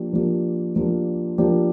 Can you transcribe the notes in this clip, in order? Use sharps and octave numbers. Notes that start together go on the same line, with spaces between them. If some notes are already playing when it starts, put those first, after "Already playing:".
Already playing: F3 A#3 D4 G4
F3 A#3 D4 G4
F3 A#3 D4 G4
F3 A#3 D4 G4